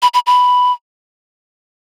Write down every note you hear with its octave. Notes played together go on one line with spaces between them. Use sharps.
B5
B5
B5